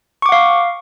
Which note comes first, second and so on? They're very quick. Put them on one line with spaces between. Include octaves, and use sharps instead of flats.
C#6 D6 F#5 F5